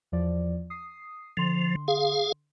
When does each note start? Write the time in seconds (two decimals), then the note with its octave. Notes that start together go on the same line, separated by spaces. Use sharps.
0.12 E2 F3 D5
0.70 D#6 C7
1.37 D3 F3 C6
1.88 G#4 F5